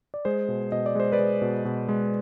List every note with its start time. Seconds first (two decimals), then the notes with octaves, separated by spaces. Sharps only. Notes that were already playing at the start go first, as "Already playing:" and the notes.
0.14 D5
0.25 G#3 G#4 C5
0.48 B2
0.72 B2 D#5
0.86 D5
0.95 G#3 C5
1.12 B4 D5
1.19 G#3
1.42 B2
1.65 B2
1.89 G#3